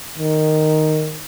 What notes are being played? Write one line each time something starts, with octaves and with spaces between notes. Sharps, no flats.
D#3